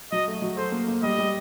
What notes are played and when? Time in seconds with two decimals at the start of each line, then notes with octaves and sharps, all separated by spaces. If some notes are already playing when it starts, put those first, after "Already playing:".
0.12 F#3 D#5
0.27 A3
0.42 F#3
0.57 A4 C5
0.72 A#3
0.88 A#3
1.03 G3 D#5
1.18 G3